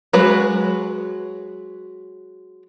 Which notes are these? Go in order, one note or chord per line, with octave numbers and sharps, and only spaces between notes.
F#3 G#3 B4